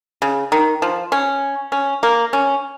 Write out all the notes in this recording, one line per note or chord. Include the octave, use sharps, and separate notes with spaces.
C#3
D#3
F3
C#4
C#4
A#3
C#4